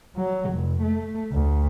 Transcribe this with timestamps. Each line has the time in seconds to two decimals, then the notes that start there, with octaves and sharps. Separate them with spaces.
0.16 F#3
0.51 F1
0.82 A3
1.32 D2